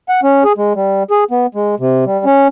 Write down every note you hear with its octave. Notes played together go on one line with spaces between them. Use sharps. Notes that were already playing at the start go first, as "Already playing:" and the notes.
F#5
C#4
G#4
G#3
G3
G#4
B3
G#3
C3
G3
C#4